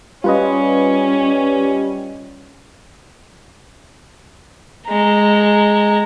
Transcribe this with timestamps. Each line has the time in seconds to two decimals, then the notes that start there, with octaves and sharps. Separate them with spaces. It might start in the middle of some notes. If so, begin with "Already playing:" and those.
0.24 G3 C#4 F4 B4 D#5
4.88 G#3 A#5